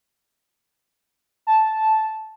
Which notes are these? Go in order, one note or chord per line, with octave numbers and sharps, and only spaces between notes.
A5